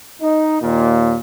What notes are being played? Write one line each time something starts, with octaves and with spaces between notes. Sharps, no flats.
D#4
D#2 A#2